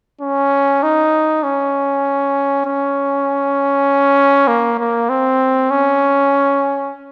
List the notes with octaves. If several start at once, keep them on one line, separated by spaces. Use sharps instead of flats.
C#4
D#4
C#4
C#4
A#3
A#3
C4
C#4